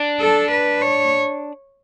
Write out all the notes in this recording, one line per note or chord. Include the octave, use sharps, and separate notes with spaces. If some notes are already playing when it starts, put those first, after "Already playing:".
Already playing: D4
A4
B4
C#5